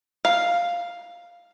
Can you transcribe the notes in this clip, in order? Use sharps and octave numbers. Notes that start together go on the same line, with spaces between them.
F5